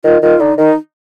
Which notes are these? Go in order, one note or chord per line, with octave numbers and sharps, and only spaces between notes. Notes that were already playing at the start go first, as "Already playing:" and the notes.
D#3 F4
D#3 F4
D3 D#4
D#3 D#4